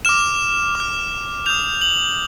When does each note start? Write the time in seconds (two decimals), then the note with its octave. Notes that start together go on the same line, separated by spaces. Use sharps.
0.05 D6 F6 E7
0.75 D6 F6
1.46 D#6 G6 F7
1.81 F#7